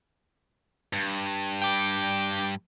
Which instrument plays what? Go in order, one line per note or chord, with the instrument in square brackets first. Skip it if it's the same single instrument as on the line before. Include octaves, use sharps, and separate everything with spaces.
[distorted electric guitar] G2
[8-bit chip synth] G5 D6